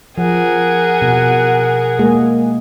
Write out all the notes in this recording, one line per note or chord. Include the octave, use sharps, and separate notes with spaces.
F3 G#4 A#4 F#5
B2
G#3 A#3 G#4